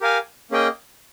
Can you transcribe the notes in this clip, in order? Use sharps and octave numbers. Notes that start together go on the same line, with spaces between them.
G4 A#4 F5 G#5
A#3 C#4 G#4 D#5 G5